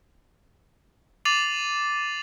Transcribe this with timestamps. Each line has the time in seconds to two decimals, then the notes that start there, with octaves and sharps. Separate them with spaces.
1.25 D6 A6 C7 D#7 F7 F#7